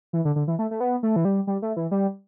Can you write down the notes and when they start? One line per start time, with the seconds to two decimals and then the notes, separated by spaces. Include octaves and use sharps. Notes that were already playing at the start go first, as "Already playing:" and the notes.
0.13 E3
0.25 D3
0.36 D3
0.48 E3
0.59 A3
0.71 A3
0.80 B3
1.03 A3
1.16 E3
1.25 G3
1.47 G3
1.62 A3
1.76 E3
1.91 G3